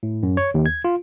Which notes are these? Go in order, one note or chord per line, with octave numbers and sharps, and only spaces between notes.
A2
F#2
C#5
D#2
G#6
F4